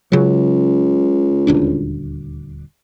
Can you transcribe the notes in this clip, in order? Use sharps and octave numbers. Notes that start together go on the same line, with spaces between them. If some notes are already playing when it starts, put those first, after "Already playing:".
C#2 C#3 F#3
D#1 D2 D4